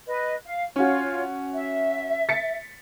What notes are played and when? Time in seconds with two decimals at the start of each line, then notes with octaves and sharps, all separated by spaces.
0.07 B4 D#5
0.46 F5
0.76 C#4 F4 F#4 C#5
1.53 E5
2.29 A6 B6 C#7